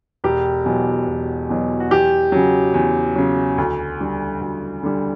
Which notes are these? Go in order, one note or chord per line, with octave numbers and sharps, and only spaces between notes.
E1 G4
E2 B2 F#3
E1
E2 B2 F#3
F#4
E2 G4
C#3 F#3
E2
C#3 F#3
D2
D3 G3
D2
D3 G3